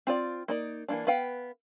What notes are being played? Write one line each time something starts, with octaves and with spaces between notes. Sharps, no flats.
C4 F4 D5
A#3 D#4 D5
E3 A#3 D4
B3 B4 F5 G5